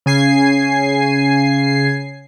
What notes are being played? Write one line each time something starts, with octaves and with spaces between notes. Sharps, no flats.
C#3 G#5 C7